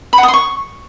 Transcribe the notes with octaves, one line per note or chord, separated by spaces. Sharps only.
B5
F#5
D#6
C6
C#6